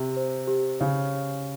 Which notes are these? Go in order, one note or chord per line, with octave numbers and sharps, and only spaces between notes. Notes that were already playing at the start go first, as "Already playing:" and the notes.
Already playing: C3 G4
C5
G4
C#3 C#5